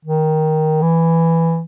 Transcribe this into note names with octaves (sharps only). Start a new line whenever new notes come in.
D#3
E3